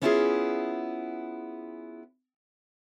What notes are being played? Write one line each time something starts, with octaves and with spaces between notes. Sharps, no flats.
B3 C#4 E4 F4 G4 G#4